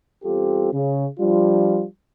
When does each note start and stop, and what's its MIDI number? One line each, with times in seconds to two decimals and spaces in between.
0.24 0.69 40
0.24 0.69 55
0.24 0.69 60
0.24 0.69 65
0.24 0.69 67
0.24 0.69 69
0.73 1.07 49
1.19 1.85 53
1.19 1.85 55
1.19 1.85 62
1.19 1.85 65